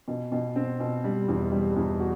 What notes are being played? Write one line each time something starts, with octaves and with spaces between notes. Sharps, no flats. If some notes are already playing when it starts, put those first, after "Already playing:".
B2
B2
C4
B2
G3
E2
G3
E2
F#4